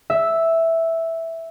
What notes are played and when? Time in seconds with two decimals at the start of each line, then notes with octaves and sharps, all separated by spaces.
0.10 E5